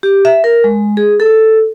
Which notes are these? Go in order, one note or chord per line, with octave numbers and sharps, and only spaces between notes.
G4
E5
A#4
G#3
G#4
A4